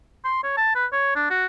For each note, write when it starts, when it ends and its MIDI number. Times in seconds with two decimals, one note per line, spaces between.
0.25 0.41 84
0.43 0.54 73
0.57 0.71 81
0.75 0.86 71
0.92 1.15 73
1.16 1.28 62
1.30 1.46 66